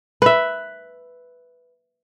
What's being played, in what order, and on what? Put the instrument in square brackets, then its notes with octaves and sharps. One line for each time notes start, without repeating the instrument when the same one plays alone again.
[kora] B4 E5